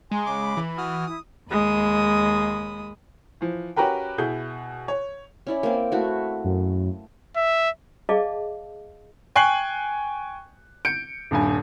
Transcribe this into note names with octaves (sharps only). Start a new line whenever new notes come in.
G#3 G#5 A#5 C6
C#3 D6
B5
E3
F#4 D#6 F6
E4 D#6
D#2 G#3 B5 D#6
E3 F3
C#4 F#4 G4 A#4 B4 G5
B2 E4 G#4 G6
C#5
C#4 E4 D5
A#3 C4
A3 E4 F#4
F#2
E5
G#4 D5 D#5 F5 A5 D6
G5 G#5 C#6 F#6 C7 F#7
G6 C#7 D7
D#1 G2 G#5